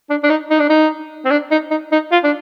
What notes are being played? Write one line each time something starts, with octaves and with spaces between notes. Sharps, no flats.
D4
D4
D#4
D#4
D4
D#4
C4
D4
D#4
D#4
D#4
F4
D4